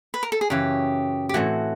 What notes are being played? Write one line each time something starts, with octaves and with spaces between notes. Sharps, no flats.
B4
A#4
A4
G#4
F#2 C#3 E3 G4
G4
A2 E3 A3 C4 F#4